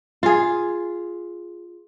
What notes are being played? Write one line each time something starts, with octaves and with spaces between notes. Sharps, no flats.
F4 G#4